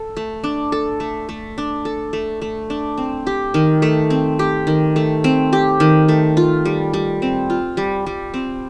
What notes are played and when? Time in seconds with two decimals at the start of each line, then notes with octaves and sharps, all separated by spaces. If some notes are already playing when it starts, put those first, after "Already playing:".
Already playing: A4
0.17 A3
0.44 D4
0.72 A4
1.00 A3
1.29 A3
1.58 D4
1.85 A4
2.13 A3
2.42 A3
2.70 D4
2.98 C4
3.27 G4
3.54 D#3
3.82 A3
4.10 C4
4.39 G4
4.67 D#3
4.96 A3
5.24 C4
5.53 G4
5.80 D#3
6.08 A3
6.37 F4
6.65 G3
6.94 G3
7.22 C4
7.50 F4
7.77 G3
8.06 G3
8.34 C4